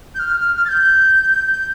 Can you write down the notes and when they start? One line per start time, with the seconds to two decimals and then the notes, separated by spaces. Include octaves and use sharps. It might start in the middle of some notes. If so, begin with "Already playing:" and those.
0.15 G6
0.19 F6
0.40 F6
0.56 F6
0.65 A6
0.69 G6
1.53 G6